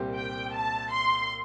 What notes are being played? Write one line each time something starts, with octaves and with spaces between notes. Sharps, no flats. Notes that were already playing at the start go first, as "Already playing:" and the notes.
Already playing: C2 A#2 G3 C4 G4
G5
A5
C6